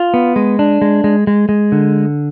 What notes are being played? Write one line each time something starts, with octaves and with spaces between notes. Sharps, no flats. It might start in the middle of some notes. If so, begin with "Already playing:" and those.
Already playing: F4
B3
G#3
D4
G#3
G#3
G#3
G#3
D3